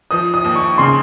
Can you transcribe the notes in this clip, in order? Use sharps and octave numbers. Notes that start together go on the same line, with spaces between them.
F3 D#6
D#6
D#2
C#6
C#3 C6